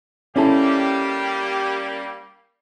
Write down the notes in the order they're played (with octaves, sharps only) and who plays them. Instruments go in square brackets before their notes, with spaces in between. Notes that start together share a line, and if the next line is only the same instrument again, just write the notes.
[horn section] G3 A#3 G4 [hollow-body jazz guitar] C#4 E4 A4